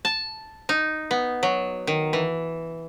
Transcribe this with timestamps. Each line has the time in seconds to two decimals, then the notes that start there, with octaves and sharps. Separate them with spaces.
0.05 A5
0.69 D#4
1.11 B3
1.43 F#3
1.87 D#3
2.13 E3